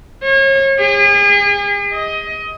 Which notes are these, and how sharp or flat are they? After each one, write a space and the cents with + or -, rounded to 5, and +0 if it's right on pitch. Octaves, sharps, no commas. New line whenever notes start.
C#5 -35
G#4 -40
D#5 +20